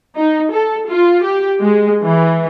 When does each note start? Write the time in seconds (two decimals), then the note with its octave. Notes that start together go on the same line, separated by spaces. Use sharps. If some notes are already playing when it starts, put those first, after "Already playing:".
0.16 D#4
0.53 A4
0.90 F4
1.23 G4
1.60 G#3
2.03 E3